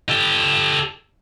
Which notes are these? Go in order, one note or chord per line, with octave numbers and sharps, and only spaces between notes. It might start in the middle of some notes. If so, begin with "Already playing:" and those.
G4 A4